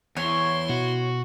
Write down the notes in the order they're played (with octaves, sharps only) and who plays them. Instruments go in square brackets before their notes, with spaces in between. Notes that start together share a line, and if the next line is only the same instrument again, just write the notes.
[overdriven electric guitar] E2 [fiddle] E4 C6 [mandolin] C#5
[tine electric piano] B2 [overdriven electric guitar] F#4